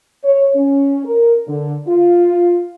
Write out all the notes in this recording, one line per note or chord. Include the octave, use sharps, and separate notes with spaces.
C#5
C#4
A#4
D3
F4